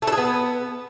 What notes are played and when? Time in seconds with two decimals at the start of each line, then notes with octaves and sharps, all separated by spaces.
0.02 A3
0.07 A4
0.12 G#4
0.18 B3